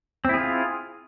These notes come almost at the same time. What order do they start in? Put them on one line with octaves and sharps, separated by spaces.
C4 E4 G#4 F4